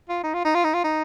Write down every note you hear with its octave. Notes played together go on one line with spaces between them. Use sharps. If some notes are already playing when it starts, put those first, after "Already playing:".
F4
D#4
F4
D#4
F4
D#4
F4
D#4